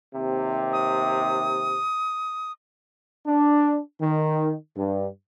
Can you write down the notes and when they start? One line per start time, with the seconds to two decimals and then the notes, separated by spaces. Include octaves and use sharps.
0.14 D#2 C3
0.73 D#6
3.25 D4
4.00 D#3
4.75 G2